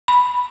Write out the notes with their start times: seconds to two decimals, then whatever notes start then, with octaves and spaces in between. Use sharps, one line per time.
0.08 B5